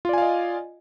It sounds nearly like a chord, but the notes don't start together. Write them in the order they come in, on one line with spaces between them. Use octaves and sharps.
F4 D5 G#5 F5 D#5